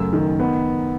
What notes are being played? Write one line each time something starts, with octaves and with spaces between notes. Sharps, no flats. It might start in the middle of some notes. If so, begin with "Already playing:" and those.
Already playing: F#2 C#3 A3 E6
D#3
B3